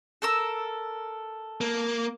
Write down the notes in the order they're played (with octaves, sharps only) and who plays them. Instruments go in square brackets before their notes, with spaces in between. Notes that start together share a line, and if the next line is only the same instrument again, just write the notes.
[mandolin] A4 A#4 E6
[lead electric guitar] A#3